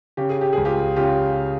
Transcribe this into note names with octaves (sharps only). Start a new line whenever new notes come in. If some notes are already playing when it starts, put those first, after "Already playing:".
C#3 G4
G#4
G4
C#2 G#4
F4 G4
C#3 F4 G4